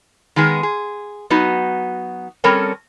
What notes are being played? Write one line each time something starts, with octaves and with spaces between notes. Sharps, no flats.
D#3 G#3 B3 G#4
G#4
F#3 B3 D#4 F#4
G3 C4 C#4 A4 A#4 C#5